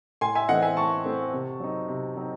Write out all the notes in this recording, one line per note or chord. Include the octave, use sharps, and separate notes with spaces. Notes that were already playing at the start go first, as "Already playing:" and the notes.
A2 G#5 C6
E5 G#5
E3 A3 C4 D#5 F#5
E5 G#5
A2 A5 C#6
E3 A3 C4
C3
F#3 C4 D#4
C3
F#3 C4 D#4